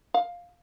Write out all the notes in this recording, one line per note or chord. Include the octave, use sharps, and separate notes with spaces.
F5